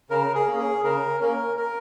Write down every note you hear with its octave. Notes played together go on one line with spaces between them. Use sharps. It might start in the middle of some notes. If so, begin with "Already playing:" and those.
C#3 A#4
G#4
A#3 C#4
G#4
C#3 A#4
A#3 C#4 A#4
A#4